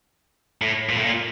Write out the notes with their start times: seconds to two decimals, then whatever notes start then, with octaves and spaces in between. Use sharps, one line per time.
0.62 A2
0.89 A#2
0.97 A2
1.05 A#2